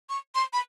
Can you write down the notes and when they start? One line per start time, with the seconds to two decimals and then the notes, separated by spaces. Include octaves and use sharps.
0.09 C#6
0.35 C6
0.53 B5